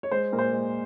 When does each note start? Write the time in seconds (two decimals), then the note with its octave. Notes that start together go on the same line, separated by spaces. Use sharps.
0.03 C#5
0.12 G#3 C5
0.33 A#2 A#4
0.39 C5
0.52 G#3